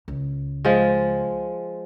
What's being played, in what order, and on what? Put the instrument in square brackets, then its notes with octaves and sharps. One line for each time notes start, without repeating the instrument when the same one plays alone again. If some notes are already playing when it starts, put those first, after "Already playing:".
[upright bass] C#2
[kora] F3 G#3